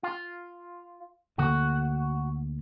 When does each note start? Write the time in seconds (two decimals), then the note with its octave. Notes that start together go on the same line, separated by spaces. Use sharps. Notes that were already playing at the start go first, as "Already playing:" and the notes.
0.03 F4
1.38 D2 D3 A#3 F#4